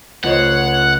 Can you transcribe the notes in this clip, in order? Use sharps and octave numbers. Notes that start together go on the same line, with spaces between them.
C#2 A3 F4 C5 C#5 D#5 F#5